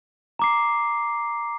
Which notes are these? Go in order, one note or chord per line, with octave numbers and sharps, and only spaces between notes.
A#5 D6 C7